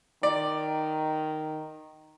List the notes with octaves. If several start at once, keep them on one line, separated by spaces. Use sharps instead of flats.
D#3 D5